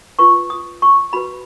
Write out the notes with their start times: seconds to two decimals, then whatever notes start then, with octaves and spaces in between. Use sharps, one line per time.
0.19 F4 B4 C#6
0.50 D#6
0.82 C#6
1.13 F#4 B4 B5